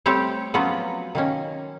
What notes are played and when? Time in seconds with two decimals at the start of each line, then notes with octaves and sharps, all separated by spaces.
0.06 G3 A3 C4 G4 A4 C#5
0.54 F3 F#3 B3 C#4 F4 F#4
1.15 D#3 A#3 C#4